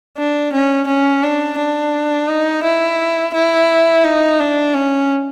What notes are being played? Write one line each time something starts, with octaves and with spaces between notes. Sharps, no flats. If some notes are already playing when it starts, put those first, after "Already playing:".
D4
C#4
C#4
D4
D4
D#4
E4
E4
D#4
D4
C#4